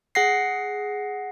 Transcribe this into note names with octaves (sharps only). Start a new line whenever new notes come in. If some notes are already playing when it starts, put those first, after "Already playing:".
G#4 F#5 A#6 C7